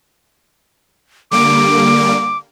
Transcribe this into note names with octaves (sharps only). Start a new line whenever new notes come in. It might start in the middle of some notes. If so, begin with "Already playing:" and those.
D3 G3 A#3 D6